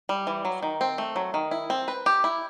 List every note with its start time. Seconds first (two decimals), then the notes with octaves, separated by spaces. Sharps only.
0.09 G3
0.27 E3
0.45 F#3
0.63 D#3
0.81 C4
0.98 A3
1.16 F#3
1.34 D#3
1.51 E4
1.70 C4
1.88 B4
2.06 G4
2.24 E4